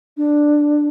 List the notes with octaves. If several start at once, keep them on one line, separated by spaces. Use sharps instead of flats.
D4